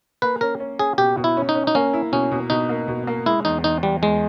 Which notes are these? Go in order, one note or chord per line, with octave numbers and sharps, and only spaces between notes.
A#3 B4
C#4 A#4
C#4
C#4 G#4
B2 G4
B2
E4
C#4
D#4
C#4
D#4
A#3 C#4
E4
B2 C#4
B2
B2 D#4
A#3
B2
A#3
G#3 E4
E2 D#4
E2 D#4
E2 G3
E2 G#3